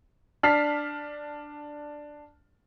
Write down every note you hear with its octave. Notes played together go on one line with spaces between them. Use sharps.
D4 A5 F6 B6 C7